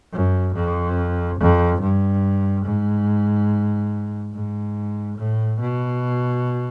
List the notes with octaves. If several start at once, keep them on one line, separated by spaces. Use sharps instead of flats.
F#2
F2
F2
G2
G#2
G#2
A2
B2